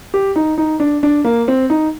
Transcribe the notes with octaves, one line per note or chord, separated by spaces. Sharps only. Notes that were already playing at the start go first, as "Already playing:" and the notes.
G4
D#4
D#4
D4
D4
A#3
C4
D#4